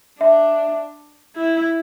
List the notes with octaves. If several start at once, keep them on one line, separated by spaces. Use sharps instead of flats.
D4 E5
E4